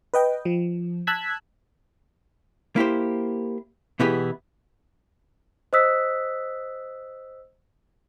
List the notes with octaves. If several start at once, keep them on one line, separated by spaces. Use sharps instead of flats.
B4 D#5 G5
F3
A5 E6 F#6 G#6 B6
A#3 E4 G4 C5
B2 E3 B3 E4 G4 G#4
C5 D#5 D#6 E6 F#6 B6